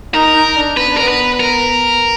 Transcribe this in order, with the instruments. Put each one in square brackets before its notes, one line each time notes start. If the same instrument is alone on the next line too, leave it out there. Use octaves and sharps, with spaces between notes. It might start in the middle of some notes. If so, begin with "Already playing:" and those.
[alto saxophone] D#4 [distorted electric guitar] A#4
[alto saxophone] D#4
D4
[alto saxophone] B3 [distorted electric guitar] B4
[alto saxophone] D4
[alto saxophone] B3 [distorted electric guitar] A#4
[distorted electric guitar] B4
A#4